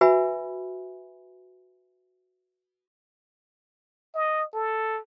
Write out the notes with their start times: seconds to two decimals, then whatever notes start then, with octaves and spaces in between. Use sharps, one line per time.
0.01 F#4 B4 E5 G#5 B5
4.15 D#5
4.54 A4